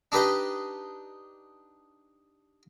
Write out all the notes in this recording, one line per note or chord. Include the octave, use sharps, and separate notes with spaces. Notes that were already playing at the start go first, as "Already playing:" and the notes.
D4 D#4 G4 B4 D#5